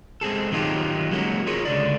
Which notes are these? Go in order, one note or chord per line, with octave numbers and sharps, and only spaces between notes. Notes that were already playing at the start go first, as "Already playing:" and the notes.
G#3 C4 G#4 A4
D#3 F#3 D#4 F4 G4
F#3 G#3 A#3 C#4 F#4
F4 G#4 A#4 C#5
C#2 D3 D5